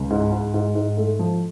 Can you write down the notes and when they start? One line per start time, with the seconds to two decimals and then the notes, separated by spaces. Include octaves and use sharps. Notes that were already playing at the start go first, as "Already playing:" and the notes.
Already playing: C#2
0.10 G#2
0.32 G#2
0.54 G#2
0.75 G#2
0.97 A3
1.19 F3